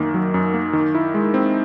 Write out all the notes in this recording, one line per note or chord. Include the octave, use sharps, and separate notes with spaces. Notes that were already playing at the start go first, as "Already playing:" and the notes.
Already playing: F#2 D#3 A#3
F#3
F#2
A#3
D#3
E4
G#3
C4